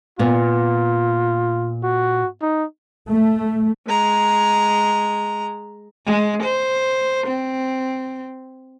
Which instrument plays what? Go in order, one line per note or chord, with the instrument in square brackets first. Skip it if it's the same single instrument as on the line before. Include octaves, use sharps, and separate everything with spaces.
[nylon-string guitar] A#2 B3 [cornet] F4
[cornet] F#4
D#4
[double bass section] A3
[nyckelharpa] G#3 A#5
[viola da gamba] G#3
C5
C4